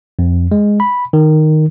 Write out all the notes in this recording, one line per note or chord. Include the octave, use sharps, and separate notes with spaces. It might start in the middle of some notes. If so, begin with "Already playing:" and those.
F2
G#3
B5
D#3